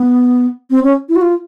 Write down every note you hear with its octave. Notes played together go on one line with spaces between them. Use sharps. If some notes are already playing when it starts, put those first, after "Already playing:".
Already playing: B3
C4
C#4
E4
F#4
F4